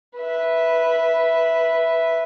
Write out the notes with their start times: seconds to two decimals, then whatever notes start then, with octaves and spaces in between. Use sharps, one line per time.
0.17 B4 E5